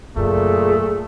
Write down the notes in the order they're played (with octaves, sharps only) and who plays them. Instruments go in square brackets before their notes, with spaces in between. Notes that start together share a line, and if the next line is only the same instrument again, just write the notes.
[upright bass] F#2 C#3 [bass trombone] A#2 [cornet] A3 [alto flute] G#4